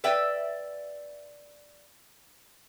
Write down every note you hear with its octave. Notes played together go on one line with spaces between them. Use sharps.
B4 D5 E5 G5